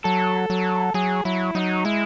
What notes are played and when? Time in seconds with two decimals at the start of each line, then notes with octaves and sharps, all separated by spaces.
0.04 F#3 A4
0.50 F#3
0.94 F#3 G#4
1.25 F#3 E4
1.55 F#3 D#4
1.85 G#3 E4